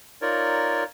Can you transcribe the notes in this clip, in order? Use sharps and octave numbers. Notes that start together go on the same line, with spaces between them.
D#4 F4 A#4 C#5 D5